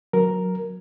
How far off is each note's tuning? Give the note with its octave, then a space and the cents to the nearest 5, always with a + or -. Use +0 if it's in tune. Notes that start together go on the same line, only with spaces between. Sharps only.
F#3 -10 A#4 +0